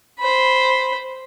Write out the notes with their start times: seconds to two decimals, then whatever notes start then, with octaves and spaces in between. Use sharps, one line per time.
0.19 C5 B5